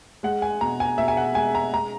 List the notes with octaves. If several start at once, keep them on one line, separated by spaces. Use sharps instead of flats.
G#3 F#5
G#5
B2 A#5
G#5
B2 E5
G#5
F#5
G#3 G#5
A#5
G#3 A#5